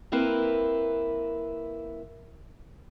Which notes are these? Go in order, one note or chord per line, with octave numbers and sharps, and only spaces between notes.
A#3 C4 E4 A#4 B4